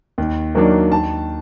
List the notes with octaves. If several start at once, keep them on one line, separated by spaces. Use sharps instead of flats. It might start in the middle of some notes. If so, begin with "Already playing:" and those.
D#2
D#3 F#3 A#3 D4
D#2 A5